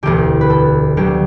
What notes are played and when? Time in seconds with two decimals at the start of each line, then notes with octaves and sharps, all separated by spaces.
0.03 E1 D2 D3 G4
0.41 B4
0.50 A4
0.97 D2 D3 F#3 G4